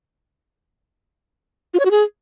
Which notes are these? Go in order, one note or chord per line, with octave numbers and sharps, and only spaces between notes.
F4
C#5
F#4
G#4